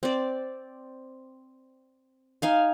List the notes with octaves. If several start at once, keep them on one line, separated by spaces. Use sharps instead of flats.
C4 D5
D#4 F5 G#5